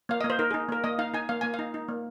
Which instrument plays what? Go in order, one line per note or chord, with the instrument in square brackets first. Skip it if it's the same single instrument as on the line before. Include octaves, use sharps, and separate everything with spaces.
[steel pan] A#3 F5
A#3 D#5
C5
D#4 A#4
G#4
D#4
A#3 A#4
A#3 D#5
D#4 F5
D#4 G#5
A#3 F5
A#3 G#5
F5
D#4
D#4
A#3